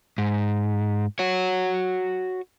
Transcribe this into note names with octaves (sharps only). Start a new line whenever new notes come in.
G#2
F#4 C#5